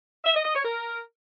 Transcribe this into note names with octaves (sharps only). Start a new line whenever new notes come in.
E5
D#5
D#5
C#5
A#4